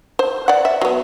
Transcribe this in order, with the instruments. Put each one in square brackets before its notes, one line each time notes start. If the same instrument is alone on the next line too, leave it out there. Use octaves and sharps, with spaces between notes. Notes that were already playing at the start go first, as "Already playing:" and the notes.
[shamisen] C5
D5 F#5
E5
F#3 B3